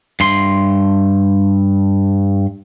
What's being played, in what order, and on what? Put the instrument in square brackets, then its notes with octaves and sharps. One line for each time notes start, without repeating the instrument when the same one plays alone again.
[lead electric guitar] G2 C6